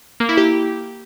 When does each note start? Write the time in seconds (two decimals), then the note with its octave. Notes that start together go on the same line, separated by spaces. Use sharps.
0.20 A#3
0.29 E4
0.37 G4